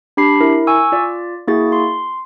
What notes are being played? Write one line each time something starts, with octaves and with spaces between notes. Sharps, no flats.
D4 G4 B5 C7
E4 A#4
G#5 C#6 E6
F4 D5
A#3 E4 F#4 G#4 A6
C6